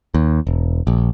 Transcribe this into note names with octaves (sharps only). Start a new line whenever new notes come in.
D#2
E1
A#1